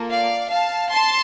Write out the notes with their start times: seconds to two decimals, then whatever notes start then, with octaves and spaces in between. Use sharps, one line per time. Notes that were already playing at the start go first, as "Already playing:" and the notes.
Already playing: A#3 F4 A4
0.10 D5 F5
0.50 F5 A5
0.91 A5 C6